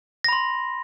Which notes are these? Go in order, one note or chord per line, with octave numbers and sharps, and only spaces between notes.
B5 C6 A#6